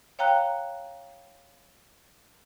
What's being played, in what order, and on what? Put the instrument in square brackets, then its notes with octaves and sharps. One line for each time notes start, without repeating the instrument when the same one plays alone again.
[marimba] C#5 F5 G5 A#5 F#6